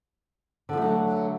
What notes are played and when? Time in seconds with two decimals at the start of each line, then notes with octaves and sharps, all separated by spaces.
0.69 D3
0.73 F3
0.77 A3
0.82 F#3